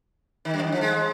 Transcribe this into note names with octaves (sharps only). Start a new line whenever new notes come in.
D#3
F#2
F3
D#3
F3
G#3